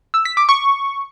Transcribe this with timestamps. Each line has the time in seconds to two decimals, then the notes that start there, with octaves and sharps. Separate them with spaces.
0.14 E6
0.25 B6
0.37 D6
0.49 C#6